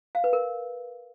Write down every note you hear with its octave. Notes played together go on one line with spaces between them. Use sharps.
F5
B4
A#4